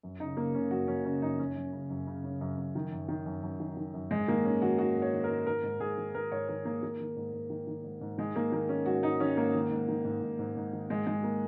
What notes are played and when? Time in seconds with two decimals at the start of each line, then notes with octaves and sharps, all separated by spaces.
0.03 F#2
0.20 C#3 D#4
0.37 C#3 A#3
0.54 C#3 C#4
0.71 F#2 F#4
0.88 F#2 C#4
1.05 C#3 C#4
1.22 F#2 D#4
1.39 F#2 C#4
1.57 F#2
1.73 C#3
1.90 F#2
2.07 C#3
2.24 C#3
2.41 F#2
2.58 F#2
2.75 D#3
2.92 F#2
3.08 D#3
3.26 F#2
3.43 F#2
3.60 D#3
3.77 D#3
3.94 F#2
4.10 G#2 G#3
4.28 D#3 A#3
4.45 D#3 C#4
4.62 D#3 F#4
4.78 D#3 F#4
4.96 G#2
5.02 C#5
5.13 D#3
5.24 A#4
5.29 G#2
5.46 D#3 A#4
5.63 G#2
5.80 G#2 G#4
5.97 D#3
6.15 G#2 A#4
6.32 G#2 C#5
6.49 D#3 A#4
6.65 D#3 A#3
6.82 D#3 A#3
7.00 D#3
7.16 G#2
7.33 G#2
7.50 D#3
7.67 D#3
7.84 G#2
8.01 G#2
8.18 D#3 G#3
8.35 D#3 A#3
8.52 D#3 A#3
8.69 D#3 C#4
8.86 G#2 F#4
9.03 G#2 D#4
9.20 D#3 C#4
9.37 G#2 A#3
9.55 D#3
9.71 G#2
9.88 D#3
10.05 G#2
10.22 G#2
10.39 G#2
10.57 G#2
10.73 D#3
10.89 G#2 G#3
11.07 D#3 G#3
11.24 A#3